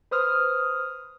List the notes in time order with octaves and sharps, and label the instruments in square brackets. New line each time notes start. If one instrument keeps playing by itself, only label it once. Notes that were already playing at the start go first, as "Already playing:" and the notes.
[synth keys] B4 C5 D#6 F6